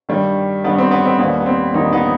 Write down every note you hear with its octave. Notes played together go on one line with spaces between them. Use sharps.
G2 D#3 G3
G2 D#3 G3 B3
C4
B3
C4
D#2 D#3 G3 B3
B3
C4
D#2 D#3 G3 B3 D#4
B3 D#4